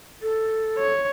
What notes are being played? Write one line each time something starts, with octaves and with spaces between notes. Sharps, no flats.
A4
C#5